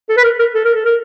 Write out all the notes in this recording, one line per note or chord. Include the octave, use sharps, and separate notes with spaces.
A4
B4
A#4
A#4
A4
A#4
A4
A#4